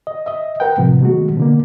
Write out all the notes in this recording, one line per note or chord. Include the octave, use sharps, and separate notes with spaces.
D#5
D#5 E5
A#4 B4 F#5 G5
A2 C3 F3
B2 D#3 F#3 G#3 A3 F#4
B2 D3 A#3